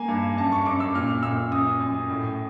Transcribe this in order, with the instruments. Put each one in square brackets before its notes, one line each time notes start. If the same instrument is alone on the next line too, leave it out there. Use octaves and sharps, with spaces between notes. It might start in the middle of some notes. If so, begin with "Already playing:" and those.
Already playing: [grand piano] A#3 G#5
G2
F#2 A5
C#6
F#2 D6
E6
A#2 F6
A#2 E6
F#2 D#6
F#2
A2